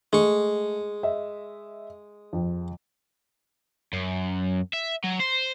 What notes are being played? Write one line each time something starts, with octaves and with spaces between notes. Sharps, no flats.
G#3 A3 C#6
D#5 E5
F2
F#2
E5
F#3
C5